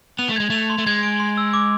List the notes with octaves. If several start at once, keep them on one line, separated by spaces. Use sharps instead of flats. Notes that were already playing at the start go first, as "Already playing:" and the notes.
B3 F7
A3
G#3 G#6
A3 F7
C6
A3
G#3 G#6
D7
C6
E6
D6